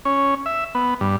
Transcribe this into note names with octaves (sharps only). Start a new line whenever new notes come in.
C#4
E5
B3
G2